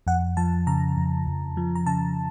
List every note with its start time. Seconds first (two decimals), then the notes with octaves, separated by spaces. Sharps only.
0.07 F2 F#5
0.37 F3 A5
0.67 C#3 A#5
0.97 F2
1.27 F2
1.57 F3
1.75 A#5
1.86 C#3 A5